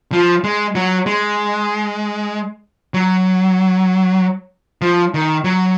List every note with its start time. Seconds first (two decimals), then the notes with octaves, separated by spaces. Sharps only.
0.12 F3
0.44 G#3
0.75 F#3
1.06 G#3
2.94 F#3
4.82 F3
5.14 D#3
5.44 F#3